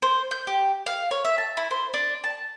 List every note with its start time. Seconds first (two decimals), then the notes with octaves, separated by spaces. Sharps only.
0.02 C5
0.31 G6
0.47 G4
0.86 F5
1.11 C#5
1.25 E5
1.38 A5
1.57 E4
1.71 C5
1.94 D4
2.24 A5